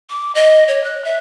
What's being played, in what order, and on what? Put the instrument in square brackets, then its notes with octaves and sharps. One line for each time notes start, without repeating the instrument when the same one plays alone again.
[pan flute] D6
D#5
C#5
F#6
E5